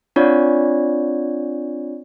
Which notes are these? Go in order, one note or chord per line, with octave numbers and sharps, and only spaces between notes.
C4 D4 F4 C#5 D5